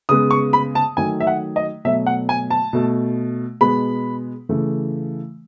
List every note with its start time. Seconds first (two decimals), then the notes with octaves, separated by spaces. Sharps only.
0.09 C#3 G#3 B3 D#6
0.31 C#6
0.53 B5
0.75 A5
0.97 D#3 F#3 A3 G#5
1.20 E5
1.27 F#5
1.56 D#5
1.85 B2 F#3 A3 E5
2.06 F#5
2.29 G#5
2.50 A5
2.73 B2 A3
3.61 B2 G#3 B3 B5
4.49 C#3 E3 A3